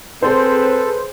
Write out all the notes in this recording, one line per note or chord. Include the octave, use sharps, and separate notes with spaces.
C4 G#4 A4 B4 C5